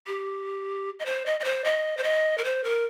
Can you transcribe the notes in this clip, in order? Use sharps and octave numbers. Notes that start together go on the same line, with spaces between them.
G4
D#5
C5
D#5
D#5
C5
D#5
C5
D#5
A#4
C5
A#4